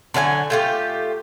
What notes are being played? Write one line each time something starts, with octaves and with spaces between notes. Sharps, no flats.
D3 F#3 F5 G#5
A3 F4 G4